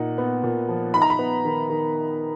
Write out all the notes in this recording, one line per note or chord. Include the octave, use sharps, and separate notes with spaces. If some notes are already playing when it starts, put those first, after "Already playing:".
Already playing: A#2 D#4 F#5
B3
A#2
F3
D#4 B5
A#5
B5
B3
D#3
D#3